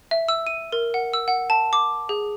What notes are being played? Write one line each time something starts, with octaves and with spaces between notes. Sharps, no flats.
E5
E6
D#7
A#4
F#5
E6
F#5
A5
D6
G#4